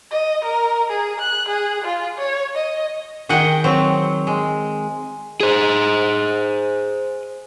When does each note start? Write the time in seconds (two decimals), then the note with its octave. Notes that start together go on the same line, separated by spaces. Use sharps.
0.11 D#5
0.44 A#4
0.90 G#4
1.20 F#6
1.48 G#4
1.84 F4
2.18 C#5
2.55 D#5
3.29 D#3 G#4 D#5 F#5 G5
3.64 F#3 C4
4.27 G#3
5.41 G#4 C5